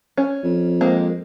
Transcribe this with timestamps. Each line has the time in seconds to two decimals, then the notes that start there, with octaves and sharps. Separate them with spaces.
0.17 C#4
0.43 F2
0.81 G#3 A#3 C4